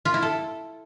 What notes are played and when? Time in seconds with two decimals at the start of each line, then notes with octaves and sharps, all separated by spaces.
0.05 F4
0.14 E4
0.22 A4